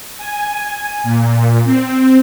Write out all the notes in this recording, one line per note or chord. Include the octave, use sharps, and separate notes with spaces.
G#5
A#2
C4